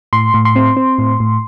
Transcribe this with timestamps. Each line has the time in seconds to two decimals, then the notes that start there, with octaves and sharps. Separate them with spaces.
0.13 A2 C6
0.34 A2
0.45 C6
0.56 C4
0.77 C4
0.99 A2
1.20 A2